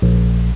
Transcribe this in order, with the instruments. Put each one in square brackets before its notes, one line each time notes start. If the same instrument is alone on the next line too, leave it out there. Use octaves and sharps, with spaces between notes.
[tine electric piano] A#1